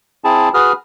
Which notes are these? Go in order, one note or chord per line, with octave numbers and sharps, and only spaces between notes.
C4 E4 G#4 A5
F#4 G#4 B4 D#6 F6